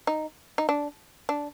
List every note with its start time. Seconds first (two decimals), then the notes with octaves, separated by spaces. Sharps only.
0.07 D#4
0.58 D#4
0.69 D4
1.29 D4